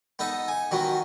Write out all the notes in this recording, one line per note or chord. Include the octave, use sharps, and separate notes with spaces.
B3 D#4 A4
G#5
D#3 F#3 B3